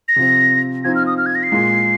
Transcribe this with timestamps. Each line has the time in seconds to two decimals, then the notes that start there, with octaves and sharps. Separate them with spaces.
0.08 A#6
0.16 C3 F3 C4
0.84 F3 C4 D#4 G#6
0.95 F6
1.07 D#6
1.18 F6
1.26 G#6
1.35 A#6
1.43 C7
1.52 A#2 G#3 F4